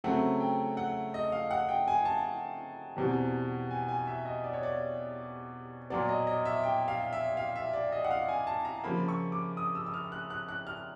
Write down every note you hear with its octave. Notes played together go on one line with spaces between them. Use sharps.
C#3 F#3 A3 C4 F#5
G5
F#5
D#5
F5
F#5
G5
G#5
A5
E2 B2 G3 C4
G#5
G#5
E5
D#5
D5
C#5
D5
A#2 F#3 B3 D5
D#5
D#5
E5
G5
F5
E5
F5
E5
D5
D#5
F#5
F5
G#5
A5
A#5
C#3 F3 A#3 B5
C#6
D6
D#6
E6
E6
F6
F#6
F#6
F#6
F6